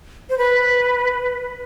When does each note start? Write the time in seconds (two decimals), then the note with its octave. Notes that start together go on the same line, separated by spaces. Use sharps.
0.30 C5
0.38 B4